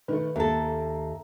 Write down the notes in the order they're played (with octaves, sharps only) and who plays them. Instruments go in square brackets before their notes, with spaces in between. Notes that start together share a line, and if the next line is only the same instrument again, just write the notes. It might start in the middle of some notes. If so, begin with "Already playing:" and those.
[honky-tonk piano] D#3 A3 [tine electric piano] B4
[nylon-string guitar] D#2 A4 [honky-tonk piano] A#3 [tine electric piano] E5 A#5